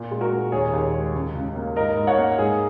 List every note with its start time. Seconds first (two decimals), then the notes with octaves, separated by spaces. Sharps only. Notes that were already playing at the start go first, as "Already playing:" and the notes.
Already playing: A#2
0.11 G#3
0.21 F#4 A#4
0.32 A#2
0.52 D#2 G#4 C#5
0.73 D#2
0.94 G#3
1.14 C#2
1.35 C#2
1.56 A#3
1.76 G#2 A#4 D#5
1.97 G#2
2.07 C#5 F#5
2.18 A#3
2.38 G#2 G#4